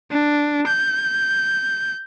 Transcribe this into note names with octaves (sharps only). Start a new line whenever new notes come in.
D4
G6